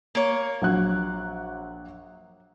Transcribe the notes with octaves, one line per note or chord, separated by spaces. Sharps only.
A#3 C#5
A#1 F#3 F#6